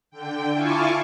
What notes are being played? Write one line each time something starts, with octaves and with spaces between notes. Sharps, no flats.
D3 G5
E4 F4 G#5 A5 C#6 D6